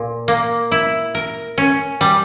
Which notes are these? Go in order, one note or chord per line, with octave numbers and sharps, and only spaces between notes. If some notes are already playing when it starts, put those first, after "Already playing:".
Already playing: A#2
A#3
E4
A#4
C#4
G3